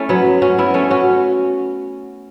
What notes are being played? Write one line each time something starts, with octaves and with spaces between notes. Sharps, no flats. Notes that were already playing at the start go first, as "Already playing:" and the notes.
Already playing: A3 C#4 E4
F#3 B3
C#4 F#4
B3 E4
A3 C#4
C#4 F#4